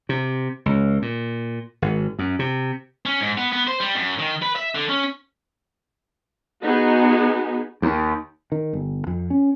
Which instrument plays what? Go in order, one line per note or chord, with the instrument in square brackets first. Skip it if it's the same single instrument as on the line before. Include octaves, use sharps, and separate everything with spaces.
[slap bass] C3
C#2
A#2
G#1
F#2
C3
[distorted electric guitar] C#4
G#2
B3
B3
C5
G3
F#2
D#3
B4
E5
D3
C#4
[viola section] B3 D#4 F#4 G#4
[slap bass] D#2
[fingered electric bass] D#3
G1
F2
C#4